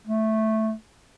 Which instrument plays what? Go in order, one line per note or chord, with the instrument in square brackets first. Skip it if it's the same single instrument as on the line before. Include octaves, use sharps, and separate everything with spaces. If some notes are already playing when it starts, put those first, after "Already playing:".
[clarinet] A3